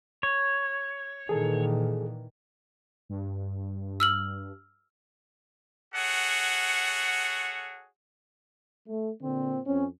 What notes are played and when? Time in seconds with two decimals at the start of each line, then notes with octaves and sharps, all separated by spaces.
0.23 C#5
1.29 A#2 D#3 E3 G#4 A4
3.09 G2
4.00 E6 F6 F#7
5.95 F#4 G#4 A4 C#5 F#5
8.87 A3
9.22 A#2 D3 C4
9.65 F2 C4 C#4